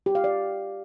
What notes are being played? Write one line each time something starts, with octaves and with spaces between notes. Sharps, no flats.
G4
F5
D5